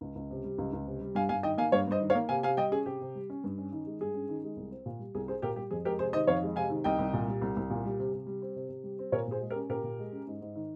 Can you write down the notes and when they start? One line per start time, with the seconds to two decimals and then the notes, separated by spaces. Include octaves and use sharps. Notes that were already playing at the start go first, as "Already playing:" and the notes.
0.01 C#2
0.15 C#2
0.31 C3
0.44 G3
0.58 C#2
0.73 C#2
0.87 C3
1.01 G3
1.15 G2 F5 G#5
1.29 G2 F5 G#5
1.43 D#3 D#5 G5
1.58 A#3 F5 G#5
1.72 G2 C#5 F5
1.87 G2 C5 D#5
2.00 D#3
2.10 C#5 F5
2.15 A#3
2.29 C3 F5 G#5
2.43 C3 F5 G#5
2.57 G3 D#5 G5
2.72 C#4 G#4
2.86 C3 G4
3.01 C3
3.15 G3
3.30 C#4
3.44 G2
3.58 C#4
3.72 D#3
3.86 G#3
4.00 G2 G#4
4.14 C#4
4.29 D#3
4.44 G#3
4.57 C2
4.71 C4
4.86 A#2
4.99 G3
5.15 C2 G#4
5.28 C4 G#4 C5
5.42 A#2 G4 A#4
5.56 G3 G4
5.71 F2 G#4
5.85 G#3 G4 A#4
5.99 C3 G#4 C5
6.13 D#3 C5 D#5
6.27 F2 C#5 F5
6.43 G#3
6.56 C3 F5 G#5
6.70 D#3
6.84 C2 D#5 G5
6.99 C2
7.13 A#2
7.28 G3
7.42 C2
7.57 C2
7.70 A#2
7.85 G3
7.99 C3
8.13 C3
8.27 G3
8.42 C4
8.56 C3
8.69 C3
8.84 G3
8.99 C4
9.12 A#2 A#4 C#5
9.27 A#2 G#4 C5
9.41 G#3
9.50 G4 A#4
9.55 C#4
9.69 A#2 G4 A#4
9.83 A#2
9.99 G#3
10.12 C#4
10.27 G#2
10.41 G#2
10.56 D#3